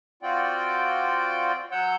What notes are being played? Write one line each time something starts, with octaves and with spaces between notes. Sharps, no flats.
C4 F4 F#4 D5 G5
F#3 C#5 F#5 E6 G6